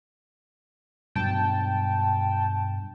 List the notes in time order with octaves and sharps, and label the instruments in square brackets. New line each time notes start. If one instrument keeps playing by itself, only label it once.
[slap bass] G2 B2 F#3 [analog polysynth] G5 A5